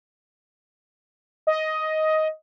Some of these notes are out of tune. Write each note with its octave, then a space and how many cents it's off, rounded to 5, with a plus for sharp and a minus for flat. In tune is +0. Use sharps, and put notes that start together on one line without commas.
D#5 +10